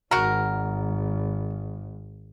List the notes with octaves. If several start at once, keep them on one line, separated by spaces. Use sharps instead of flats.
G#1 F#4 A#4